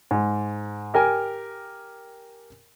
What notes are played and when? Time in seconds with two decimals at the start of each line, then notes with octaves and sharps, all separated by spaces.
0.11 G#2
0.94 G4 A#4 G5 G#5